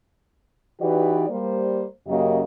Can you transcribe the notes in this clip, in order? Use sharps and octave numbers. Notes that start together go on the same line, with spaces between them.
E3 D#4 F#4 G4 B4 D5
G3 A#3 C5
F#2 C#3 F#3 A#3 G4 D#5